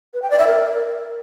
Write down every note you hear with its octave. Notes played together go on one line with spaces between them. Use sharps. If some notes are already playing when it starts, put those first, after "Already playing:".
B4
G5
D5
E5
A#4